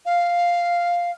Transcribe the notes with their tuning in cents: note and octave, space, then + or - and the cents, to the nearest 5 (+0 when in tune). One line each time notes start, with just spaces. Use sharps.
F5 +0